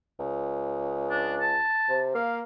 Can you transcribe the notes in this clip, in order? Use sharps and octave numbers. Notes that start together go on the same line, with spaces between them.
C#2
D4
A5
C3
A#3 F5